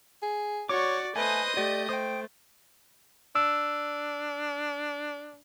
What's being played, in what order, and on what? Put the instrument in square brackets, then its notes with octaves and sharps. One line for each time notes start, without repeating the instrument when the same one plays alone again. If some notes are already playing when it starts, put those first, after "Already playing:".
[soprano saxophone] G#4
[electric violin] F#4 D5 [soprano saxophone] C#5 [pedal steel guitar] C#6 D6
[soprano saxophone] A3 [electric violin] B4 C5 [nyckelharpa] D#5 D#6 [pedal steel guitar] G#5
[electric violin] A3 [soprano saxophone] G4 [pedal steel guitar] D5
[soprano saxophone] C5 [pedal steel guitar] G5 D#6
[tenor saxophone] D4 [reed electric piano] E6